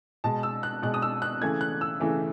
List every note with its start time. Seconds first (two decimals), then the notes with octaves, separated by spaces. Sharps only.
0.24 B2 G#3 A5
0.43 E6
0.63 F#6
0.82 B2 G#3 F#6
0.94 D#6
1.02 E6
1.22 F#6
1.41 C#3 E3 A3 G#6
1.61 F#6
1.81 E6
2.00 C#3 E3 A3